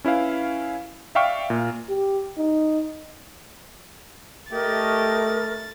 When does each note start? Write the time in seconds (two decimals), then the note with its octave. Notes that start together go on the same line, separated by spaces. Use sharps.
0.04 C#4 E4 B4 F5
1.15 D5 E5 F5 G5 C#6 F6
1.50 A#2
1.89 G4
2.38 D#4
4.53 A3 G4 A#4 D#5 A6